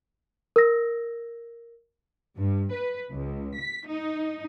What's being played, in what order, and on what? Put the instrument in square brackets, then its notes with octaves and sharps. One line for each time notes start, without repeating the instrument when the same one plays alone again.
[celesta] A#4 E6 A#6
[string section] G2
B4
C#2
B6
D#4